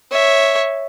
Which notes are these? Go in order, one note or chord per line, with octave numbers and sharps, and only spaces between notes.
C#5 E5